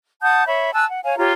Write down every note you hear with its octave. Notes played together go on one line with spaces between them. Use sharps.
F#5 A5 D#6 G6
C#5 E5 B5
G#5 A5 E6 F#6
F#5
C#5 F5 G#5
F4 G4 C#5 A#5